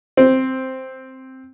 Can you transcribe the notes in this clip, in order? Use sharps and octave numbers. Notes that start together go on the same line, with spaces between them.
C4